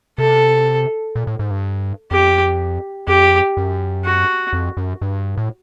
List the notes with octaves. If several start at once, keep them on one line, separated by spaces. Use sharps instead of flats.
C3 A4
A#2
A2
G#2
G2
F2 G4
F2 G4
F#2
F#4
F2
F#2
G2
A2